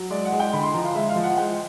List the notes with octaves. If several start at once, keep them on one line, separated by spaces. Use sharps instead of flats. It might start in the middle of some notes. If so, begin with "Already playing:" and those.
Already playing: F#3
G#3 D5
F#5
G#3
G5
D3 B5
C6
F3 A#5
F5
G#3 E5
F5
F3
F#5
G#3 G5